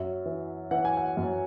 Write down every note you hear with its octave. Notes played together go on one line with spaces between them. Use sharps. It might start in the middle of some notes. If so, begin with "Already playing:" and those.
Already playing: F#2 E5
E3
E3 F#5
G#5
F#5
F#2